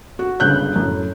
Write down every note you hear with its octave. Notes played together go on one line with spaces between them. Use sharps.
F#4
G1 C#2 C#3 F#6 G6
F#2 A2